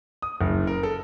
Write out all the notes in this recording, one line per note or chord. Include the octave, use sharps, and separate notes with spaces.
D#6
F#1
A#4
A4